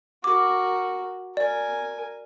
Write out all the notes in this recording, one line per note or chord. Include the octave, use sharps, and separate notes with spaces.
F#4 A#4 D6
A#4 D5 G#5